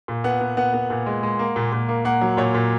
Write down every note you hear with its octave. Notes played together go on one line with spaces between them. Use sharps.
A#2
B3 F#5
B3
B3 F#5
B3
A#2
G#3
G#3
A#3
A#2
A#2
A#3
A#3 F#5
F#3
A#2 C#5
A#2